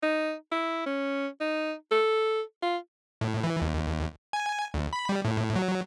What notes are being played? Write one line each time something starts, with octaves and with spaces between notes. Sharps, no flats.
D#4
E4
C#4
D#4
A4
F4
A2
E3
D#2
G#5
D2
B5
G3
A2
F#3